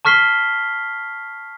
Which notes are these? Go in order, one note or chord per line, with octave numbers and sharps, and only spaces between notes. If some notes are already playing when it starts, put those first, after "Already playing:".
A5 C#6 F6 B6 C7 G7